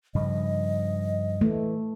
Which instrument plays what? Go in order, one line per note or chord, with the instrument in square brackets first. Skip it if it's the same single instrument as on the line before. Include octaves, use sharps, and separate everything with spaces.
[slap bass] G2 C#3 F3 [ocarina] D#5
[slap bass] E3 [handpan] A3